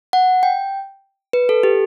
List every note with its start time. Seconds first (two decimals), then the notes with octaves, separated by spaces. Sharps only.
0.13 F#5
0.43 G5
1.33 B4
1.49 A4
1.63 G4